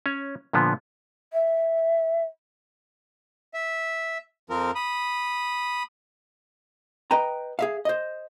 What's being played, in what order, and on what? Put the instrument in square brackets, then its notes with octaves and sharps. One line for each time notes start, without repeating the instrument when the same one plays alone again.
[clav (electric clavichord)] C#4 C#5
A#2 D3 F3 B3
[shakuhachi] E5
[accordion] E5
F2 F3 C4 A#4
B5 D#6
[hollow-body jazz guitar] B4 D#5 G5 A#5
G#4 E5 F5
C5 D#5